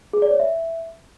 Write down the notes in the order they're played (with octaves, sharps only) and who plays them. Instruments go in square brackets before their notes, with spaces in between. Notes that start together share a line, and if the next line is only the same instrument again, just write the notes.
[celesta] G#4
D5
C#5
E5